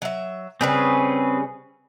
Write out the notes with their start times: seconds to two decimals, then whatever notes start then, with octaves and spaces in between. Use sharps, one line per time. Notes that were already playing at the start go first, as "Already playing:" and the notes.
0.02 F#3 E5
0.61 C#3 G3 C4 C#4 G#4 B4